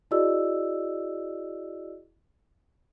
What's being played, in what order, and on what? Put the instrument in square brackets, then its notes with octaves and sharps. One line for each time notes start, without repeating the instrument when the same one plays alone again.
[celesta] E4 F#4 G#4 D5 D#5 E6